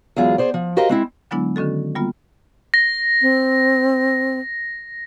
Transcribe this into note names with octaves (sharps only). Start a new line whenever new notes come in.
E2 F#3 G#3 F4 G#4
G#4 C5 D5
F3
F#4 G4 A#4 C5 D#5 F5
G#3 C4 E4
D3 F#3 G#3 B3 D4 E4
D3 D#3 C#4 F#4 A4
G3 A#3 B3 F4
A#6
C4